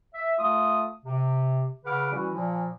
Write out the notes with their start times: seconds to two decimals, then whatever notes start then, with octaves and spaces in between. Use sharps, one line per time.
0.14 E5
0.39 A3 F4 D#6
1.05 C3
1.85 C#3 B4 F#5 D6 F6
2.12 E3 G3 C#4 E4 F#4
2.34 A#2 F3